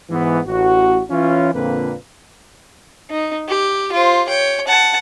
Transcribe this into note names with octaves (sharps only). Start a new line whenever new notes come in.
G#2 E3 B3
A1 F#4
E3 C#4 F4
F2 A#2 D3 A#3 C4 B4
D#4
G4
F4 C5
C#5 G5
F#5 A5